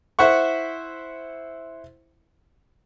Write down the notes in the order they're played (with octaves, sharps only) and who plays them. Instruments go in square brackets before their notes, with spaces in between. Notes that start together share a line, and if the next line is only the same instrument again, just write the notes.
[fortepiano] E4 C5 E5 F#5 C#6